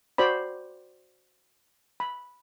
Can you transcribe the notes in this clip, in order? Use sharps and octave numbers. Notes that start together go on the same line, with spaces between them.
F#4 C5 D5 B5
B5